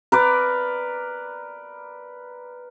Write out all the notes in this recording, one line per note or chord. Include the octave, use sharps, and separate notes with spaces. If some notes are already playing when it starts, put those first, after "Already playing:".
A#4 B4 D5